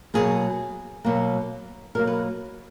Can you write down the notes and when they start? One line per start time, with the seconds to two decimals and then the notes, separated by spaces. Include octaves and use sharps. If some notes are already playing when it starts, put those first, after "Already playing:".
0.14 B2 F#3 A#3 G#4
1.05 B2 F#3 A#3
1.95 B2 F#3 A#3 A#4
2.07 B4